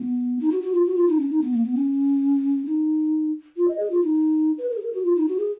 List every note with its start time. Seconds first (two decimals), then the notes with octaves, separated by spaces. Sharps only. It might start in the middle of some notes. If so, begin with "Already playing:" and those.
Already playing: B3
0.39 D#4
0.50 F#4
0.61 F#4
0.73 F4
0.84 F#4
0.96 F4
1.07 D#4
1.18 C#4
1.29 D#4
1.41 B3
1.52 A#3
1.63 B3
1.75 C#4
2.65 D#4
3.56 F4
3.68 D#5
3.79 G#4
3.90 F4
4.02 D#4
4.58 B4
4.69 A#4
4.77 G#4
4.81 A#4
4.92 F#4
5.04 F4
5.15 D#4
5.27 F#4
5.38 G#4